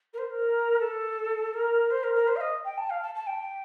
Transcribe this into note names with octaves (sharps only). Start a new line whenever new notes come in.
A#4
C5
A#4
A4
A#4
C5
A#4
A#4
C5
F5
D#5
G5
A5
F5
A5
A5
G5